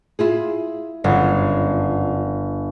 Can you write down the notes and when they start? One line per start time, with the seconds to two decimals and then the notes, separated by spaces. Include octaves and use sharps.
0.19 E4 F4 G#4
1.04 G1 F#2 C#3 F3